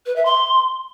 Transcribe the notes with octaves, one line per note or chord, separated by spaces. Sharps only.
B4
E5
C6